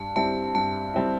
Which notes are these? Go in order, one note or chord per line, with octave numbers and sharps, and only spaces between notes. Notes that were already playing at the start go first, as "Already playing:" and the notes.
Already playing: G2 A5
G3 C4 E4 A5
G2 A5
G3 C4 E4